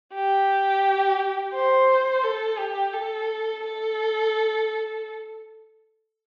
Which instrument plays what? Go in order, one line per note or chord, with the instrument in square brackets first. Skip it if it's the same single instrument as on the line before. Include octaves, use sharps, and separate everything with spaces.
[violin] G4
C5
A4
G4
A4
A4